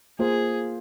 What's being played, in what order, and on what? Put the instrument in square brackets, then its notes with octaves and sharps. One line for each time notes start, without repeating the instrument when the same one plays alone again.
[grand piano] A#3 F4 C5 [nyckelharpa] G#4